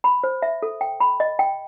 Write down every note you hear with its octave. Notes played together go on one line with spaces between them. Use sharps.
B5
C5
E5
A4
G5
B5
D#5
G5